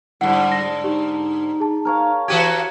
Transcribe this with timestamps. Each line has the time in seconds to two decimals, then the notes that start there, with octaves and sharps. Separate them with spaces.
0.21 G#2 D3 G3 E4 F#5
0.52 A#6
0.84 D#4 G4
1.60 G#4 A5
1.85 A#4 C#5 F5
2.28 E3 F#4 G4 G#6 D#7